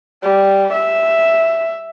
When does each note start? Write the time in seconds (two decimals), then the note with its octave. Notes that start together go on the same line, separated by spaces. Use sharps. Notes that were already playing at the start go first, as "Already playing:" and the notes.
0.23 G3
0.73 E5